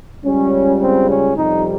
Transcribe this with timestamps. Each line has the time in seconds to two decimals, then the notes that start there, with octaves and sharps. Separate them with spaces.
0.24 C#2 C#3 G3 C#4
0.81 C4
1.08 C#4
1.37 F2 C3 G3 D#4